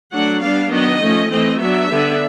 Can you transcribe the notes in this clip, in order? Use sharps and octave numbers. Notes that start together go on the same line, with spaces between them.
F#3 A3 D4 F#5
G3 B3 D4 F5
D#3 F#3 B3 D4 D#5
F3 A3 C#4
E3 A3 C4 D#5
F#3 B3 D4 E5
D3 G3 B3 D4